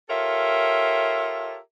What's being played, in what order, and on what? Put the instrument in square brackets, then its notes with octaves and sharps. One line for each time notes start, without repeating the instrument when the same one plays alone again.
[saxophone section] F4 G4 A4 A#4 C#5 E5